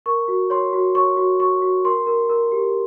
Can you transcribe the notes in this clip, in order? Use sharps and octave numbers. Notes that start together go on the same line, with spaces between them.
A#4 C#6
F#4
C#5 C6
F#4
C#5 C#6
F#4
F#4 C#6
F#4
A#4 C6
A#4
A#4
G4